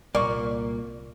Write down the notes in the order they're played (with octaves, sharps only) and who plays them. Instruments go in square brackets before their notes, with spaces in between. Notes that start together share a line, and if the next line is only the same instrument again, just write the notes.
[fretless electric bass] C2 A#2 [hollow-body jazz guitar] A#3 [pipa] D5 C#6